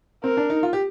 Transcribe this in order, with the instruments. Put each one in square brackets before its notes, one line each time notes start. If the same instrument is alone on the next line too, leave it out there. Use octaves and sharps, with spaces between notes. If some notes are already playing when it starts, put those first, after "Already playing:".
[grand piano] C4 [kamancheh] A#4
[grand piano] D4
D#4
F4
G4